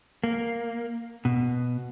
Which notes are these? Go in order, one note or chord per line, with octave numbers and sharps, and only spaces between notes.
A#3
B2